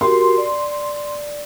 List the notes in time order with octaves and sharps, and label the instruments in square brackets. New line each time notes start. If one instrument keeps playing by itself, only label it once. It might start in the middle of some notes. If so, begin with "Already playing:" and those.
[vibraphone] F#4 G4 A#4 [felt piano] C6
[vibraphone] D5